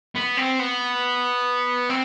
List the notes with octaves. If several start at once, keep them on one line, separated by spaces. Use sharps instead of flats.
B3
C4
B3
C4